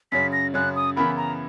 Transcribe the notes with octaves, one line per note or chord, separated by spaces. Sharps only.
F#2 C#3 F#3 B6
A#6
F#2 C#3 F#3 F#6
D#6
C#3 E3 B3 E4 A#4 B5
A#5